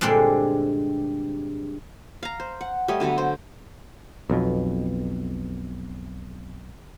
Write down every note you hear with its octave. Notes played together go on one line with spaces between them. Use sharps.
G2 A#2 D3 G#3 C4
F5 A#5
C5
F#5
G3 A3 C#5 D#5
D3 F#3 B3 A4
C5
B1 F2 B2